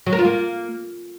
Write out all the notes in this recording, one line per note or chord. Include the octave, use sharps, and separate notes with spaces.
F#3
A#4
F4
A#3